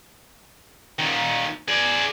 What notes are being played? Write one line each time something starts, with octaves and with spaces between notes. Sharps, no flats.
A#2 D#3
G#4 D5